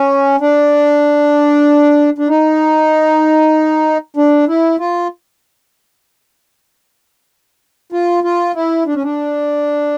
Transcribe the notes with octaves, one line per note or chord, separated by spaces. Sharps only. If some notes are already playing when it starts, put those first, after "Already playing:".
Already playing: C#4
D4
D4
D#4
D4
E4
F4
F4
F4
E4
D4
C#4
D4